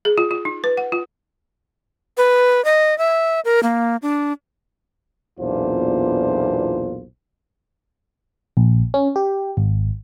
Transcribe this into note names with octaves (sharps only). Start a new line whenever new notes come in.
G#4
F4
F4
D#4
B4
F#5
F4
B4
D#5
E5
A#4
A#3
D4
B1 E2 A#2 D4 F4 C5
A#1
C#4
G4
G#1